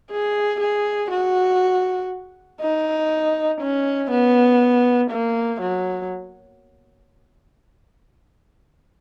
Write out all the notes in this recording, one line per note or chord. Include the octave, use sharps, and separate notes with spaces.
G#4
G#4
F#4
D#4
C#4
B3
A#3
F#3